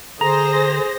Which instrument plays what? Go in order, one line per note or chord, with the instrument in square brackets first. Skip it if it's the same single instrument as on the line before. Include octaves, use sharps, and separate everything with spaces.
[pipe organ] D3 [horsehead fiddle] G#4 [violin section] C5 A#6 [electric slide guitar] A#5